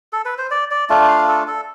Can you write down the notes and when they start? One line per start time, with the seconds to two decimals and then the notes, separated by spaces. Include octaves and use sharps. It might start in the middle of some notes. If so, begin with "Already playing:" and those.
0.13 A4
0.25 B4
0.38 C5
0.51 D5
0.71 D5
0.90 A3 D4 F4
1.08 F5
1.28 A4
1.48 A4